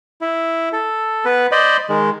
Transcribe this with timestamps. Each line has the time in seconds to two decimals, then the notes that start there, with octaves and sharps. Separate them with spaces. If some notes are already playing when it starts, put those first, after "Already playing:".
0.21 E4
0.73 A4
1.25 B3 B4
1.51 C5 D5 D#5 B5
1.89 D#3 G#3